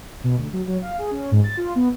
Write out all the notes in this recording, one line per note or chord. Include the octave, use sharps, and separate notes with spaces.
B2
D2
F#3
F#3
F5
G#4
C#4
G#2
A6
F4
B3